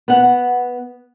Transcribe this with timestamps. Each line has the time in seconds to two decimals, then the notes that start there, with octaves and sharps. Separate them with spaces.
0.08 B3 F#5